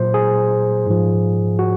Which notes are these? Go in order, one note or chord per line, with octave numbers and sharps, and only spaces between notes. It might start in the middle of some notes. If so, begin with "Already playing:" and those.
Already playing: A#2 F#3 C5
G#4
G#2 F3
F#4